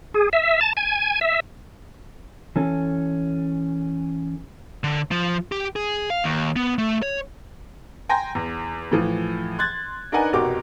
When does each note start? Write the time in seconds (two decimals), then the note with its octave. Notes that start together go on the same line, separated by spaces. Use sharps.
0.14 G#4
0.33 E5
0.61 A5
0.77 G#5
1.21 E5
2.56 E3 C#4 A4
4.84 D3
5.11 F3
5.52 G4
5.76 G#4
6.10 F5
6.24 D#2
6.56 B3
6.78 A3
7.02 C#5
8.09 G5 G#5 A#5 C6 A#6
8.35 E2
8.91 A2 E3 F3
9.58 C6 F#6 G#6 A6
10.12 D4 D#4 A#4 B4 F#5 G#5
10.33 F1 B2 F#4 G4 A#4 D6